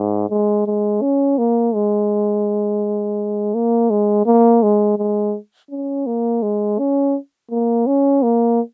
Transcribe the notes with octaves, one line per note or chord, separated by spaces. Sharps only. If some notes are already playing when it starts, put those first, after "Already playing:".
Already playing: G#2
G#3
G#3
C#4
A#3
G#3
A#3
G#3
A#3
G#3
G#3
C#4
A#3
G#3
C#4
A#3
C#4
A#3